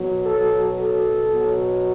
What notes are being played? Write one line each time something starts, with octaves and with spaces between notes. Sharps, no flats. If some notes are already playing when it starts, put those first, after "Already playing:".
Already playing: B2 F#3
A4
A4
B2 F#3